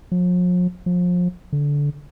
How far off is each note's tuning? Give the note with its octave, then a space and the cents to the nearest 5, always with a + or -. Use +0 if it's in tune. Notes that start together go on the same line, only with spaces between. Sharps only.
F3 +45
F3 +30
D3 -20